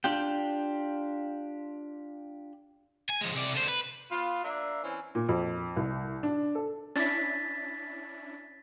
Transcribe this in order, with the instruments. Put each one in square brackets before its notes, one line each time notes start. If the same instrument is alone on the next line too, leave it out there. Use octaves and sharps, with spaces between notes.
[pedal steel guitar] D4 F4 G4 G5
[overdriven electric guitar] G#5
F3 G#3
C3 D5
D3 C5
B4
[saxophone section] B3 F4
A#3 D4 E5
E3 C4 C#4
[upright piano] A#2
F2
C2
D4
A4
[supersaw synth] C#4 D4 E4 [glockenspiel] A6 B6